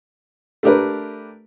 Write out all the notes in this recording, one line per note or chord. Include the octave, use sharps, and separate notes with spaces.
A3 D4 G4 A#4 B4